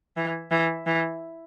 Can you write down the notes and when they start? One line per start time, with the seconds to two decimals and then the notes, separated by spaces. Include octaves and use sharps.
0.17 E3
0.51 E3
0.87 E3